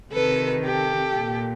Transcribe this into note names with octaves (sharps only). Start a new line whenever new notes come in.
C3 D#3 A4 B4
G4 A4
A#2